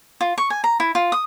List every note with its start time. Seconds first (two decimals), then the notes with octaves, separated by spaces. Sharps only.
0.21 F4
0.38 C#6
0.50 G#5
0.64 A#5
0.80 E4
0.95 F4
1.12 D#6